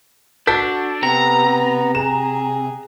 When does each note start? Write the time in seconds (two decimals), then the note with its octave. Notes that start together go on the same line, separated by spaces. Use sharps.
0.47 D4 F#4 A4 G6 B6
1.03 C3 B3 A#5
1.95 G#4 E7